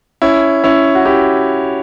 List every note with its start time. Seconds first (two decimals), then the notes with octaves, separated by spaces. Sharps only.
0.22 C#4 E4
0.64 C#4 E4
0.95 F#4
1.06 E4 G4